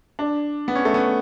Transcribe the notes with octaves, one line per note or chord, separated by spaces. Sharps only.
D4
B3
C#4
A3
B3